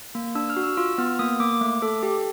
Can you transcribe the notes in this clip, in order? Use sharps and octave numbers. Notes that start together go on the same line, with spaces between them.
A#3
D4 E6
F6
F#4
E6
F4 E6
B3 F6
A#3 D#6
A#3 D6
A3
A4
G4